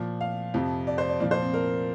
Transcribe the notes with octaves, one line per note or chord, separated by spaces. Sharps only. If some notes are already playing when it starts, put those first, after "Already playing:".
Already playing: A#2 F3
F5
F2 C3 F3
D5
C5
D5
A#2 F3 D5
C5
C4
A#4